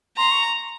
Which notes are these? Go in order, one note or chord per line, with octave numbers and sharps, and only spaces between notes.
A#5 C6
C#6